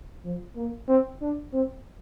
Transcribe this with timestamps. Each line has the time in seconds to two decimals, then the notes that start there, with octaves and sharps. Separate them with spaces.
0.25 F3
0.56 A#3
0.88 C4
1.22 D4
1.53 C4